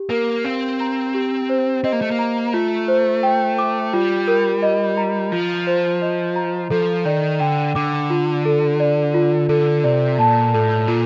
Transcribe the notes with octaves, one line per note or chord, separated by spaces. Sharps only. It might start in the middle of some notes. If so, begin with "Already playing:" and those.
Already playing: G4
A#3 A#4
C4 F5
A#5
G4
C5
C4 D#5
A#3
A3
A#3
A#5
A3 F4
C5
G5
D6
G3 F4
A#4
D#5
A#5
F3 F4
C5
D#5
A#5
F3 A4
D#3 D5
D3 G5
D3 D6
F4
A4
D5
F4
D3 A4
C3 D5
A#2 A5
A2 A4
A#2 F4